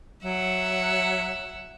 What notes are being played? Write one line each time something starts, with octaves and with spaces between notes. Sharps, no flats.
F#3 E5 F#5